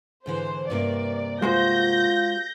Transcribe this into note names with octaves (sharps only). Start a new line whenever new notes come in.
G#2 D3 E3 C5
G2 C3 A#3 D5
G#3 F4 F#4 C5 G6 A#6